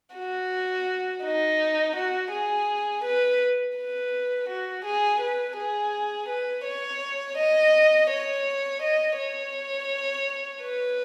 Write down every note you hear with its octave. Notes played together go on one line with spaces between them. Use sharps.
F#4
D#4
F#4
G#4
B4
B4
F#4
G#4
B4
G#4
B4
C#5
D#5
C#5
D#5
C#5
B4